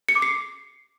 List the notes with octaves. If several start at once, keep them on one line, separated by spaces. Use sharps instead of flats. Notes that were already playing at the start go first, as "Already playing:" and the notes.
C#7
D6
C7